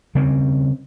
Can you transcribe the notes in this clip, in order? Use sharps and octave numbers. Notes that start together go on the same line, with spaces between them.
C#3 G3 C4 C#4